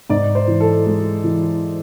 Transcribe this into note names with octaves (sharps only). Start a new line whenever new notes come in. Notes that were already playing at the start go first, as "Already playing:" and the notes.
G#2 D5
C5
E3
A4
G#3
E3